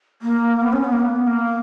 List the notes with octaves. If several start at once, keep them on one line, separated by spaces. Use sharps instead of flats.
A#3
B3
C#4
B3
A#3
B3
A#3